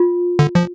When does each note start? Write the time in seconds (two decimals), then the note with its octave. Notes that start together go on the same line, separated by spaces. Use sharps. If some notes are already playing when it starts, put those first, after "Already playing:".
Already playing: F4
0.39 D3
0.55 F3